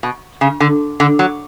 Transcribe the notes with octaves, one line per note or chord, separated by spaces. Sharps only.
B2
C#3
D3
D3
F#3